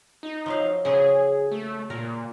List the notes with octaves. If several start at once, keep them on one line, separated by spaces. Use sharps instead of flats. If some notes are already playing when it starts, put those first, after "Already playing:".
D#4
F3 F#3 F5
C#3 F3 F#3 G#4
A3
A#2 A#4